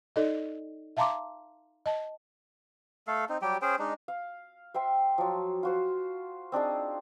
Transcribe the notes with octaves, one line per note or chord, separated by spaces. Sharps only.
D#4 A4 D5 D#5
E5 F5 A5 A#5 C6 D6
D#5 A5
A3 A4 F5
C4 D#4
F#3 G3 G4 G5
C#4 G#4 C5 G5
G#3 D4 D#4
F5
C5 E5 G5 C6
F3 F#3
F4 F#4 C5
C4 D4 D#4 G#4